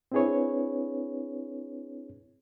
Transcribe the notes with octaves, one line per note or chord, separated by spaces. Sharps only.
C4 D4 E4 G#4 B4 C#5